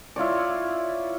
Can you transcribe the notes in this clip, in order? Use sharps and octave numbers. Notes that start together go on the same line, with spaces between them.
E4 F4 C#5 D5